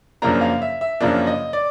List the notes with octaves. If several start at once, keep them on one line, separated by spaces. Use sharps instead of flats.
F#2 C#3 F3 A#3 D4 A#5
F5
E5
E5
F#2 C#3 F3 A#3 D4
D#5
D5